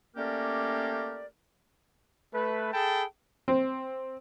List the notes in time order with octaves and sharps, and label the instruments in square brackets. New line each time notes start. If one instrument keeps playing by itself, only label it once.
[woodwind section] A3 A#3 C#4 G4 A#4 D5
[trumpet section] A3 B4
G#4 A4 G5 A5 B5
[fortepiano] C4